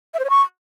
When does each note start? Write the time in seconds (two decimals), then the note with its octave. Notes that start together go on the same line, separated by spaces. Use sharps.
0.14 E5
0.19 C5
0.25 C#5
0.30 C#6